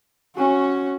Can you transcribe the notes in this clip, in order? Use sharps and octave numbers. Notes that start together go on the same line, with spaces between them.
C#4 F#4